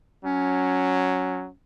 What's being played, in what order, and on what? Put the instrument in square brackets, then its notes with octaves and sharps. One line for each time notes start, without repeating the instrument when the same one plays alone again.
[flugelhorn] F#3 [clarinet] C#4